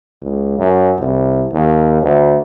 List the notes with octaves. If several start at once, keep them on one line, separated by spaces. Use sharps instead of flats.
C#2
F#2
C2
D#2
D2